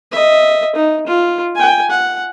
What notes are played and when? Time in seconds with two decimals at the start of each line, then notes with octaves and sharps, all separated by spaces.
0.12 D#5 E5
0.75 D#4
1.07 F4
1.55 G5 G#5
1.91 F#5